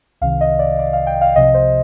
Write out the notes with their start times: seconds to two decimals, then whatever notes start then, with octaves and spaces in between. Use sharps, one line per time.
0.21 C2 C3 D#3 F5
0.41 D#5
0.59 D5
0.79 D5
0.93 F5
1.07 G5
1.21 F5
1.36 C2 C3 F3 D#5
1.54 C5